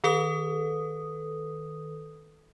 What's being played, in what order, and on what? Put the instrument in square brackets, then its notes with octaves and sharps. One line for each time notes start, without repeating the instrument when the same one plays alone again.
[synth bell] D#3 A4 B4 D#6